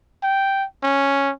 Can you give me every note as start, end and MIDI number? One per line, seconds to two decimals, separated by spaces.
0.23 0.65 79
0.83 1.31 61